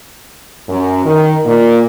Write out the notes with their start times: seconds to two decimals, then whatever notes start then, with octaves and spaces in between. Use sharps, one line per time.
0.68 F#2
1.04 D#3
1.45 A#2